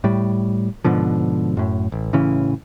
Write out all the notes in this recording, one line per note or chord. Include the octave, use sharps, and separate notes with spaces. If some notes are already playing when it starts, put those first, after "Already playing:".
A2 G3
G#2 B2 D3 F3
F#2 A2
A1
A1 C#3 E3 C#4